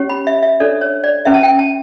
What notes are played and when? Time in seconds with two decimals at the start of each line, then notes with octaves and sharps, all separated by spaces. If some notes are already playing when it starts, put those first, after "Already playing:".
Already playing: C#4 G4 C#5
0.09 B5
0.27 E5
0.43 E5
0.60 D4 A4 C#5 D5
0.81 C#5
1.04 D5
1.25 C#4 E4 B4 E5
1.34 A5
1.43 G5
1.59 A5